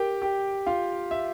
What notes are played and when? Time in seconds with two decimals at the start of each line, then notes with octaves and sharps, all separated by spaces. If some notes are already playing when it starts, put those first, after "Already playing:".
Already playing: G4 A#4 G5
0.22 G4 G5
0.66 F4 F5
1.11 E5